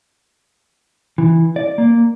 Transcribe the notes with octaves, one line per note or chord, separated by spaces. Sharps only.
E3
D5
A#3